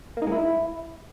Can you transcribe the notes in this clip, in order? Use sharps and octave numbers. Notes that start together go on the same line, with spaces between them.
A#3
D#4
G#3
E4